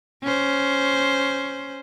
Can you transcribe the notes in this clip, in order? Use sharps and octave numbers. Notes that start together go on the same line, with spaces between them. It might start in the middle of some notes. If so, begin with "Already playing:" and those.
C#4 C5